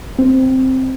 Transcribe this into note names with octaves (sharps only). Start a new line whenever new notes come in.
C4